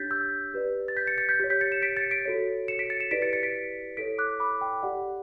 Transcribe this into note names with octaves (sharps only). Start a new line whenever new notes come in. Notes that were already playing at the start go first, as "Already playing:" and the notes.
Already playing: D4 G4 C#5 G6 A6 B6
E6 G6
G4 B4 D5
A6
G6 B6
A6 C#7
A6 C#7
G6 B6
G4 C#5
G6 B6
A6 C#7
C#7 E7
B6 D7
A6 C#7
B6 D7
F#4 A4 C#5
C#7 E7
B6 D7
A6 C#7
C#7 E7
E4 G4 B4 D5 B6 D7
A6 C#7
A6 C#7
B6 D7
E4 A4 C#5 B6 D7
D6 F#6
B5 D6
G5
G4 D5 F#5